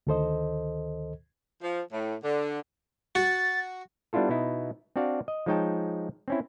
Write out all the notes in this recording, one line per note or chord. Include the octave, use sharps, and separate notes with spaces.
D2 D#3 A4 C5 D#5
F3
A2
D3
F#4 A6
G3 B3 D4 E4 F4 A4
B2 B3 D#4 E4
C4 D4 F#4 D5 F5
D#5
F3 G#3 D#4 C#5 G5 A5
C4 C#4 E4